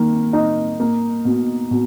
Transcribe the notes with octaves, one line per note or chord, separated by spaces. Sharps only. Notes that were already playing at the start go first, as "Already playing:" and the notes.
Already playing: D#3 A#3
D#4
A#3
B2
B2